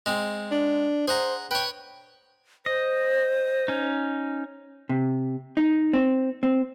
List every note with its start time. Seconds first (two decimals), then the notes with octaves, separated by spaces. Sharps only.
0.06 G#3 C4
0.52 D4
1.08 G#4 C5 F#5 A#5
1.51 B4 C#5 G5
2.66 C5 D#5
3.68 C#4 D#4
4.89 C3
5.57 D#4
5.93 C4
6.43 C4